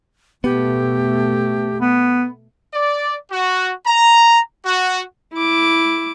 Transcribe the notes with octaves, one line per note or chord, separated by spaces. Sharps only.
B2 A3 B3 G4
B3
D5
F#4
A#5
F#4
E4 D6